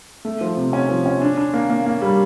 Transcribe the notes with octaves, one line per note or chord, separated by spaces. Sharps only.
A3
F3
C3
C#4
F3
C#4
D4
D4
A#3
A#3
A#3
G3